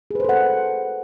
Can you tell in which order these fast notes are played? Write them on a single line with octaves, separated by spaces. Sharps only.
G#4 B4 C5 A4 F#5